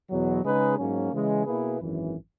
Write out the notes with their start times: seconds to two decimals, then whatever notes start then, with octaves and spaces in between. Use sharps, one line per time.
0.10 E2 B2 F#3
0.44 C#3 G#3 D#4 G#4 B4
0.78 G#2 F#3 A#3 C#4
1.12 C#3 E3 G#3
1.46 B2 A#3 E4 G#4 B4
1.81 G#1 F#2 E3